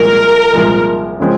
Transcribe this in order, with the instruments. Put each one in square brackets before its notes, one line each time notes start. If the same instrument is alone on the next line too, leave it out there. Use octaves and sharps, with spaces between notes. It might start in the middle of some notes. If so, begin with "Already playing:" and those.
Already playing: [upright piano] C2 A#2 F3 G#3 [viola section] A#4
[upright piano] C2 A#2 F3 G#3
C#3 F3 G#3 C4